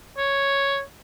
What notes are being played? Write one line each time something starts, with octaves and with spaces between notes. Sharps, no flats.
C#5